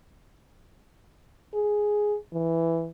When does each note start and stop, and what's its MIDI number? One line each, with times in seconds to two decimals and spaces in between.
1.54 2.17 68
2.33 2.90 52